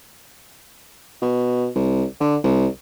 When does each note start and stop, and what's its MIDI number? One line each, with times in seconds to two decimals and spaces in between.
1.22 1.67 47
1.75 2.05 36
2.20 2.36 50
2.44 2.66 36